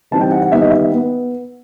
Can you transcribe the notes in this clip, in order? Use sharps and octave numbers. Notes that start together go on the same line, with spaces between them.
C3 E3 G3 C4 D#4 A5
G5
F#5
F#5
D#3 G3 B3 D#4 E5
D#5
E5
B3